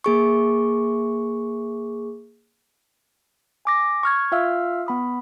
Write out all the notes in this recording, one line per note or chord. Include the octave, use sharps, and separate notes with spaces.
A#3 G#4 C#6
G#5 D6 A#6
C#6 F6 G#6
F4 E5 F5 E6 F6
B3 B5 D#6